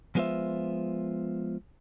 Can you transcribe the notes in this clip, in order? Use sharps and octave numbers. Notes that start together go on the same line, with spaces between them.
F3 G#3 B3 F4 C5 E5